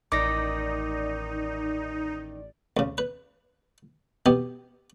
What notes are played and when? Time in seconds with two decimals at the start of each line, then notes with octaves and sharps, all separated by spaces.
0.12 A1 D#3 D#4 D5 D6 A#6
2.77 D2 C#3
2.98 B4
4.26 B2 B3 G4